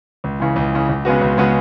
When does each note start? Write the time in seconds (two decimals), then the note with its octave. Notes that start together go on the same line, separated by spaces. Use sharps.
0.24 C#2
0.40 C#3 E3
0.56 C#2
0.73 C#3 E3
0.89 C#2
1.05 C#3 G#3 B3 F#4
1.21 C#2
1.38 C#3 G#3 B3 F#4